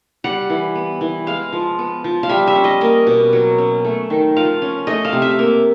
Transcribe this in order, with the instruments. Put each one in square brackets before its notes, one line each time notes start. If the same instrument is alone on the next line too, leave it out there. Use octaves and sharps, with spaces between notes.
[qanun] G3 F#5
E3
B3
E3
G#3 F5
F3
B3
F3
F5
G3 E5
E5
C#4
D#5
A#3 D#5
B2
F#3
C#4
A3
D#3
F3 F5
C#4
A3 D#5
F5
C3
E5
A#3